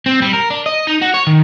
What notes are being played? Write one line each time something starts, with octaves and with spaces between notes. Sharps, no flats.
C4
G3
A#4
D4
D#5
D#4
F#4
C#5
D#3